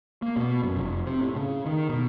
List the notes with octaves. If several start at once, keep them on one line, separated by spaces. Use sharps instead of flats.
A#3
B2
F#2
F1
C3
A2
C#3
D#3
B2